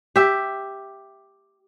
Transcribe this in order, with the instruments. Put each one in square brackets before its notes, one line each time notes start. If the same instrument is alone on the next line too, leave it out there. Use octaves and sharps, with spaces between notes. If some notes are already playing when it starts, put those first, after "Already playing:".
[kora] G4 E5